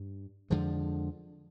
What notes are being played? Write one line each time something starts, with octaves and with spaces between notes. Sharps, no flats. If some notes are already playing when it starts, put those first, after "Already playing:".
Already playing: G2
F2 D3 F3 G#3